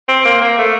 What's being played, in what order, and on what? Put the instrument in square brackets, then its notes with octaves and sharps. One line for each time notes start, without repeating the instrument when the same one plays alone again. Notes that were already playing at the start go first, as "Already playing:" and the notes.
[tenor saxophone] C4
A#3
A#3
A3